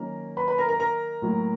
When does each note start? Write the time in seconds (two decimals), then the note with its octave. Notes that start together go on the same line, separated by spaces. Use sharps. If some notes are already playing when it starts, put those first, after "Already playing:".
Already playing: D#3 F#3 A#3 C#4 A#4 A#5
0.37 B4 B5
0.48 B4 B5
0.58 A#4 A#5
0.69 A#4 A#5
0.80 A#4 A#5
1.22 A2 F#3 A#3